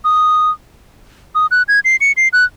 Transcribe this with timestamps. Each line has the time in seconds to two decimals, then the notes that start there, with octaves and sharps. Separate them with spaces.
0.04 D#6
1.35 D#6
1.51 F#6
1.68 G#6
1.85 C7
2.01 C#7
2.17 C7
2.33 F#6